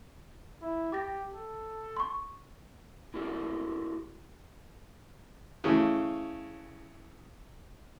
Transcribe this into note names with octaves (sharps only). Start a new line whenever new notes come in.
E4
G4 D6 A6 A#6
A4
C6 C#6
E4 F#4 G4 A4 A#4 D5
C#3 E3 A3